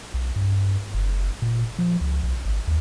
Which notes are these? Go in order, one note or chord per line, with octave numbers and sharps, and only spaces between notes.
B1
G2
F#1
A#2
F3
C#2
B1
G#1
D#2